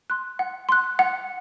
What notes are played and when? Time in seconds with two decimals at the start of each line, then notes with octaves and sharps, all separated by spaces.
0.10 C6 F#6
0.39 F#5
0.69 C6 F#6
0.99 F#5